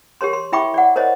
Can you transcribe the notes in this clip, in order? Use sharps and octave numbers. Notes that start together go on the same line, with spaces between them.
G4 A#4 C#5 C6
C6
E4 E5 G5 B5 C#6 D6
D5 F#5
A#4 C5 C#5 D#5